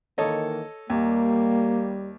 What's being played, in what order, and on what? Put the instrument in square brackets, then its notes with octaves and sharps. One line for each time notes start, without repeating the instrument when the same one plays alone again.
[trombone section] D#3 E3 A#3 [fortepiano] A4 C#5 D#5
[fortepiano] D#2 [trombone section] G3 [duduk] A#3